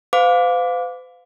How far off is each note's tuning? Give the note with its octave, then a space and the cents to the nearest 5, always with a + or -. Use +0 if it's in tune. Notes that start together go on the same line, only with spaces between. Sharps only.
C5 -45 F5 +15 D6 -10